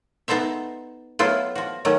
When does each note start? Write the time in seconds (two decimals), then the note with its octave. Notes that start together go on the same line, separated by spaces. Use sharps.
0.28 B3 D#4 A4 C5 E5
1.19 F#3 A3 B3 E4 F4
1.55 F3 F#4
1.85 D#3 F#3 A3 C#4